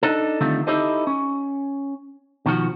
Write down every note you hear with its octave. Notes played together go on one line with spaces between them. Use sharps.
D4 D#4 A4
D3 D#3 G3 A3 C4 F4
D#4 E4 G4 A4 C5 D#5
C#4
B2 D#3 F3 F#4